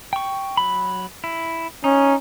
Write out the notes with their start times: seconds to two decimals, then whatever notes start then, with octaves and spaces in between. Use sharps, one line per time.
0.13 G5 C#6
0.57 F#3 B5
1.24 E4
1.84 C#4 D#4